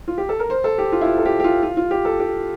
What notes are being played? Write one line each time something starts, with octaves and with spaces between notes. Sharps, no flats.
F4
G4
A4
A#4
C5
A4
G4
F4
E4
F4
A4
G4
G4
F4
F4
F4
G4
A4
G4